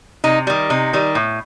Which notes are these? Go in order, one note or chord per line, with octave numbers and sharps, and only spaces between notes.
C3 D#4
D#3 G3
C3 D#4
D#3 G3
A2